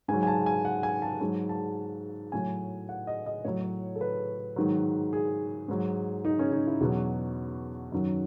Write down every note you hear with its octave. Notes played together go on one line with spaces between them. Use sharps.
G#2 F#3 G#5
G#5
A5
G#5
F#5
G#5
A5
G#2 F#3
A5
A2 F#3 G#5
F#5
D#5
D#5
A2 F#3 C#5
A4
B4
G#2 D#3 F#3
G#4
G#2 F#3
D#4
C#4
D#4
E4
E2 B2 F#3 F#4
F#2 D#3 F#3